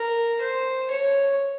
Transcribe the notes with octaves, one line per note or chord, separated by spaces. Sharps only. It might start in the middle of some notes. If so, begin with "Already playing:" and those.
Already playing: A#4
C5
C#5